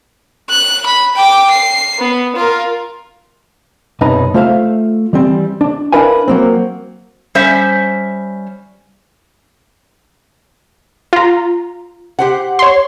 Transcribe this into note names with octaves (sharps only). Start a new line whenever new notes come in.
F#6
B5
G5 D6
C7
B3
F4 A#4
B1 F#2 C3 D#4 B4 A5
A3 F4 C5 E5 F5
E3 G3 C4
D4
D4 E4 A#4 B4 F5 G#5
F#3 A#3 C4
G3 C#4 C5 E5
F4 A#5
G4 C5 F#5
C#5 C6